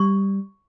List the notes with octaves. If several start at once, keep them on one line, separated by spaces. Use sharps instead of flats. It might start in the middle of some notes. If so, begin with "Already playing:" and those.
Already playing: G3 C#6